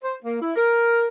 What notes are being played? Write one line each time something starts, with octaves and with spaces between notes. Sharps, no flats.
C5
A#3
E4
A#4